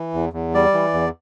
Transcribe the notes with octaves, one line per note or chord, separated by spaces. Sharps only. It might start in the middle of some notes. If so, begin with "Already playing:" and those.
Already playing: E3
E2
E2
G3 D5
E3
E2